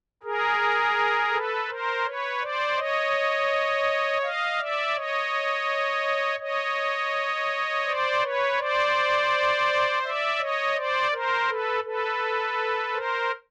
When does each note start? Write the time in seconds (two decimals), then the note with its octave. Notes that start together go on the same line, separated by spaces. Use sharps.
0.23 G#4 A#4
1.32 A4 B4
1.68 A#4 C5
2.05 B4 C#5
2.41 C5 D5
2.77 C#5 D#5
4.22 D#5 F5
4.58 D5 E5
4.95 C#5 D#5
6.39 C#5 D#5
7.85 C5 D5
8.21 B4 C#5
8.58 C5 D5
10.03 D5 E5
10.39 C#5 D#5
10.75 C5 D5
11.12 A#4 C5
11.48 A4 B4
11.84 A4 B4
12.93 A#4 C5